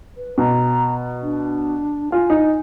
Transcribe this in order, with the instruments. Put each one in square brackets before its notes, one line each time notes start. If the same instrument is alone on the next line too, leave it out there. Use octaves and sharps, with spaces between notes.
[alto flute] B4
[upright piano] B2 [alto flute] A#5
[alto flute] D4
[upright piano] F4 [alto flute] G#5
[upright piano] D#4